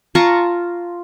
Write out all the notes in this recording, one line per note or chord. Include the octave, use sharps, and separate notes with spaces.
F4 A5 A#5 C#6